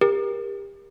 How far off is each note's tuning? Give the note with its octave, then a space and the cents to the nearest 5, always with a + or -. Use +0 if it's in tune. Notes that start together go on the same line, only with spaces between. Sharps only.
G4 +30 A#4 +20